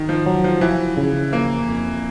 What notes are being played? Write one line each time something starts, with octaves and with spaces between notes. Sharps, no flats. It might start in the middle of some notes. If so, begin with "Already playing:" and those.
Already playing: D#3
F3
F#3
F3
E3 F3
C#3
F3 A#3
F2